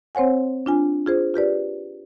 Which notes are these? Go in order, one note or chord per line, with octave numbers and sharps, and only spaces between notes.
C4 C5 C#5 F#5 G#5
D4 F4 G#5
F4 G#4 C5
F4 G4 B4 D5